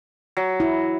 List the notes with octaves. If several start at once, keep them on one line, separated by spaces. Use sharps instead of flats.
F#3
E4